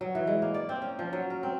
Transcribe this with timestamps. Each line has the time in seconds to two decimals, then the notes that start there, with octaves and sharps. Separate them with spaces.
0.01 F#3
0.15 E3
0.27 G#3
0.42 A#3
0.54 D5
0.69 C4
0.82 C#4
0.99 F3
1.13 F#3
1.30 A#4
1.43 C4